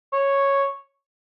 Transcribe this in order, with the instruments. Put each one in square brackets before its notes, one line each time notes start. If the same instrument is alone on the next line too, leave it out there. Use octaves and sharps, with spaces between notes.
[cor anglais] C#5